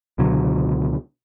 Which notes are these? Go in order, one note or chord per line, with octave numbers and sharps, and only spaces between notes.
C#2 B2 D3 F#3